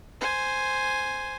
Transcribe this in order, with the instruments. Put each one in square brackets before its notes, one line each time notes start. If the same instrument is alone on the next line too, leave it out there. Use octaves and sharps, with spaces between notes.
[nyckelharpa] C5 G#5